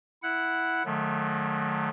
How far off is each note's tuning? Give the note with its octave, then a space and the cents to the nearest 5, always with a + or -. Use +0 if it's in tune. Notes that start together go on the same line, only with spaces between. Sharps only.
E4 +0 F#5 +0
D#3 -45 F#3 -30 A3 -30